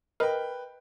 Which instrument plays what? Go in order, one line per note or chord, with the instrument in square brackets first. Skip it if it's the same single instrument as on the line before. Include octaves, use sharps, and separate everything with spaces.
[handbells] A#4 D#5 [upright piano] B4 G5